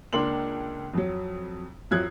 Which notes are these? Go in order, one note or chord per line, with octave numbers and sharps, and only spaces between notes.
C#2 A#3 D4 C6 F#7
F2 F#3
F2 F#3 F4 F#6 G#6